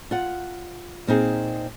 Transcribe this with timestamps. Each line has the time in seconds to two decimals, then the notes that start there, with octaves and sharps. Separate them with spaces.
0.11 F4 F#5
1.07 A#2 C4 D#4 G#4